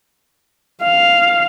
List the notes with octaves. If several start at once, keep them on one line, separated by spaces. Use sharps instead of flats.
F5